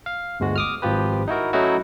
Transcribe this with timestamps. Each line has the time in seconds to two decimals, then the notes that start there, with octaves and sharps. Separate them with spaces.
0.06 F5
0.40 G1 D2 G#3 F#4
0.56 D6 D#6 F6
0.82 G#1 F3 F4 G4 B4
1.28 D#4 E4 F#4 A#4
1.53 F#3 A3 C#4 D#4 E4 F#4